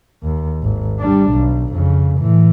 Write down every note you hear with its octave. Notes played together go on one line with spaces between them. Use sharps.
D#2
G#1
G3 D4
B1
F2 C#3
A2 E3